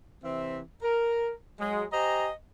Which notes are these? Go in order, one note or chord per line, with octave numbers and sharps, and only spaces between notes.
C3 E3 C4 E5
A#4
F#3 G#3
G4 C5 D#5 G#5 A#5